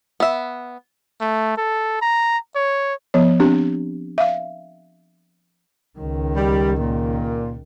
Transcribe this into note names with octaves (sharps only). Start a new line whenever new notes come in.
B3 E5
A3
A4
A#5
C#5
F3 B3 C#5
C4 D4 G4
E5 F5
C#2 D#3
G3
A#2